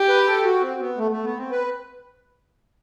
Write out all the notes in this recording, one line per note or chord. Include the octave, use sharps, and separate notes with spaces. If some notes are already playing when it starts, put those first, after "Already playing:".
Already playing: G4
B4
A4
F#4
C4
B3
A3
A3
B3
C4
B4